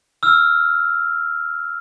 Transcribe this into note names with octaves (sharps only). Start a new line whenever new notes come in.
E6 F6